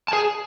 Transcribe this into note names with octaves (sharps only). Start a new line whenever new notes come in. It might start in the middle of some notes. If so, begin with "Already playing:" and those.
A5
G#4 G#5